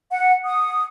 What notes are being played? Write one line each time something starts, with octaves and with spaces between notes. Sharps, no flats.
F#5
D#6